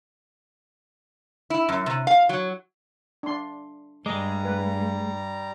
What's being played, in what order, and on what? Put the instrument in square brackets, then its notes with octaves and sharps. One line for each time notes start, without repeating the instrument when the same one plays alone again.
[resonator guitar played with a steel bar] E4
F#2
C3
F5
F#3
[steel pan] D4 C6
[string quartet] G2 [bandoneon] G3 A#5 [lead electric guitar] G#3 [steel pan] D#5 D6
[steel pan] B4